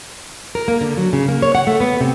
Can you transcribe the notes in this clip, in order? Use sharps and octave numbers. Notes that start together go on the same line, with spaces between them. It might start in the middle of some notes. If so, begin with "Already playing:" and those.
A#4
A#3
D3
F#3
C#3
A#3
C#5
F#5
A3
B3
C3